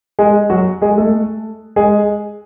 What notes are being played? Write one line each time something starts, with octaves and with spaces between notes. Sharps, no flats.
G#3 G#4
F#3 F#4
G#3 G#4
A3 A4
G#3 G#4